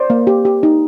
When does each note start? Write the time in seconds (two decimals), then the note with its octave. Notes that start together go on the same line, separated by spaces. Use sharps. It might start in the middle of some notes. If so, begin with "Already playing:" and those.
Already playing: C5 D5
0.10 A#3
0.27 G4
0.45 G4
0.63 D#4